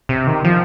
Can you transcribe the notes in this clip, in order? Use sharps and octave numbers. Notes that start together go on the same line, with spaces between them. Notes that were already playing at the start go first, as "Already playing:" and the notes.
C3
D#3
F3